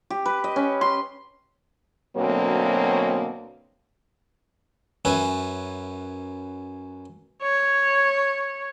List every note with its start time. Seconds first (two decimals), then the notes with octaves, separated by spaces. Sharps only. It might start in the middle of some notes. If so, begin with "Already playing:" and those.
0.10 G4
0.26 B4
0.44 D#5
0.56 C#4
0.81 C6
2.17 D2 B2 F#3 A#3 C4 C#5
5.05 F#2 C#4 B4 E5 G#5
7.43 C#5